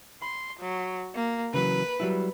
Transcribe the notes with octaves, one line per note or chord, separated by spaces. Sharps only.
B5 C6
F#3
A#3
C#3 E3 F#3 B4
F#3 G3 E4